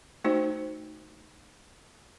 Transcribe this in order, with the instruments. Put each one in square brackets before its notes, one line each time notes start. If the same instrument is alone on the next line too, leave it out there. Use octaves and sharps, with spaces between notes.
[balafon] A3 D#4 F#4 C5